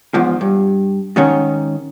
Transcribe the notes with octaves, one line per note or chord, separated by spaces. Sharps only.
E2 G#2 F3
G2
G#2 D#3 C#4